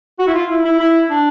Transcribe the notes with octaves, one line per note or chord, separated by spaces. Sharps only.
F#4
E4
F4
E4
E4
E4
D4